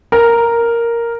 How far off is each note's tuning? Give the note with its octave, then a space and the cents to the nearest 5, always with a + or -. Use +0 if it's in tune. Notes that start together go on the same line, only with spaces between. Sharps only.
A#4 +0